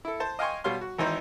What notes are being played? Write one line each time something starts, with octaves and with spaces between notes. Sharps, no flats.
E4 A4
C5 A5
D#5 F5 G5 G#5 C6 C#6
B2 G3 C#5 F5 C6
F#4
G#1 E3 D#4 C5 A#5